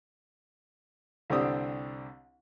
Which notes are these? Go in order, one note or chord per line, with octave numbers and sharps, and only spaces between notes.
C2 D3 C4 D4 G4 D#6